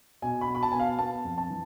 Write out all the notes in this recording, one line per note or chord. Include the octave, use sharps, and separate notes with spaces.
B2 G#5
B5
B2
B5
A5
B3 G#5
F5
B3 A5
F2
A5
E3